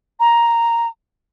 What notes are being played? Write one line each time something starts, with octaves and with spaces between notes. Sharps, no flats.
A#5